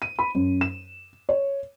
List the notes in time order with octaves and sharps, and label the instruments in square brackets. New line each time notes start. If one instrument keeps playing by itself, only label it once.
[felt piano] D#7
B5
F#2
E7
C#5